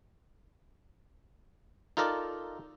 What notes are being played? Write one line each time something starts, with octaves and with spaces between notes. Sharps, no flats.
D#4 F4 A4 A#4 D5